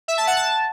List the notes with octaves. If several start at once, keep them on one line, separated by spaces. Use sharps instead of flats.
E5
A5
F#5
A5